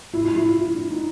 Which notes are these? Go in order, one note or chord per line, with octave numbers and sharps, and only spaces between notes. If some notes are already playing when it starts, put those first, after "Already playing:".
E4
E4
E4
F4
E4
D4
D#4